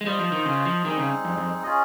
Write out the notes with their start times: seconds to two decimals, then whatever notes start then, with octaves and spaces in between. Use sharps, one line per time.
0.01 G#3
0.06 G3 F4 C5 D#5
0.19 F3
0.32 D#3
0.46 C#3
0.65 F3
0.84 D#3 G3 C4 D#4 G#4
0.98 C#3
1.25 F2
1.37 F2
1.63 C#4 F4 G#4 D#5